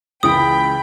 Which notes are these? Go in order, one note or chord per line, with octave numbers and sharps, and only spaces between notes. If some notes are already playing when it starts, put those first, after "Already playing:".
C#2 E3 G5 B5 D#6 D7